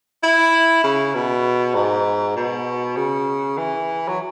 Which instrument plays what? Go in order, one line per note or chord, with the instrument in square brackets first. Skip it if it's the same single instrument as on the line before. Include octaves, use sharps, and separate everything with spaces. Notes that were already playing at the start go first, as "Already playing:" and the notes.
[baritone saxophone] E4
C#3
B2
G#2
B2
C#3
E3
F#3